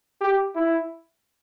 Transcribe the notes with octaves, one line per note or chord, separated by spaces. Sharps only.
G4
E4